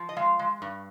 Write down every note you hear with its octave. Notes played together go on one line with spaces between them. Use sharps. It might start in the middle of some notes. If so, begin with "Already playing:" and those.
Already playing: F3
D#5
G#3 F5
G#3
G2